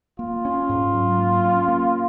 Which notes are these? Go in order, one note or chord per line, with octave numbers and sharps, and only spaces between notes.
A#3 F4
C#4
G#2
F#3
A#3
C#4
A#3